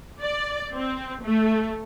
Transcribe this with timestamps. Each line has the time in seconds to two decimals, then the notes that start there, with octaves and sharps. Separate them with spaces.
0.21 D5
0.74 C4
1.24 A3